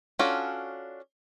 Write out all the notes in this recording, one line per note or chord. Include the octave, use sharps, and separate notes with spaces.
C#4 D4 F4 F#4 A4